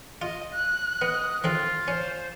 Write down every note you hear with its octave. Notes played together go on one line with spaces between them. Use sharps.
F4 D#5
F#6
B3 D#5
D#3 C4 F4 A4
C#4 C5